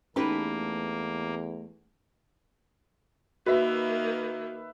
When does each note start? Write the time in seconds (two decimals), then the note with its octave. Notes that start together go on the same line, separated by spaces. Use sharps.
0.16 E2 A3 A#3 C#4 D#4 G4 A4 B4
3.46 D#3 A#3 F#4 B4 E5